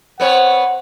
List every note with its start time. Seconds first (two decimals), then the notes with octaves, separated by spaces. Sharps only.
0.20 B3 C4 C#5 F#5